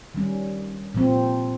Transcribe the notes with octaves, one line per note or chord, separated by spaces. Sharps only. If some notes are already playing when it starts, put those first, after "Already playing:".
D#3 G3 C#4
A#2 F3 C4